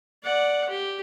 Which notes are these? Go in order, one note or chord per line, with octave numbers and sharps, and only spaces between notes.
D5 F#5
G4